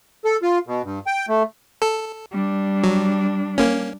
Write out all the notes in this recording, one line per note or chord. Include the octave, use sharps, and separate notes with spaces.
A4
F4
B2
G2
G5
A3
A4
G3 D4
F#3
A#3 C#4